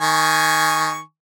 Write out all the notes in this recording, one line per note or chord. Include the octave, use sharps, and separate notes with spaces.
D#3 G#5 C#6